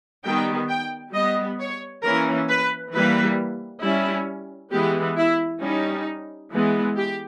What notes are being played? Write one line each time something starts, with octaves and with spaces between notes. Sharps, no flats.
D#3 G3 B3 G5
G5
G3 B3 D#5
C#5
E3 A#3 C#4 A#4
B4
E3 G3 A#3 B4
G3 C#4 E4
E3 G#3 B3 G4
E4
G3 C#4 D#4
E3 G#3 B3
G4